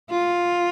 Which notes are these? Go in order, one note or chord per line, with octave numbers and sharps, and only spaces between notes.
F4